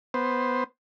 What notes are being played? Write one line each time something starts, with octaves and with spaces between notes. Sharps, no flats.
B3 C5